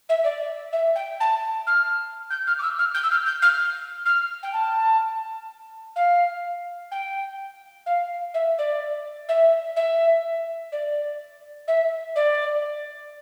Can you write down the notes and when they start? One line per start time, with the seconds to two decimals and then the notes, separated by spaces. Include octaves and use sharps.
0.09 E5
0.23 D5
0.72 E5
0.95 G5
1.20 A5
1.66 F6
2.30 G6
2.46 F6
2.58 D6
2.62 E6
2.78 F6
2.94 G6
3.03 E6
3.10 F6
3.25 G6
3.42 F6
4.05 F6
4.42 G5
4.53 A5
5.95 F5
6.91 G5
7.86 F5
8.34 E5
8.58 D5
9.28 E5
9.76 E5
10.72 D5
11.67 E5
12.15 D5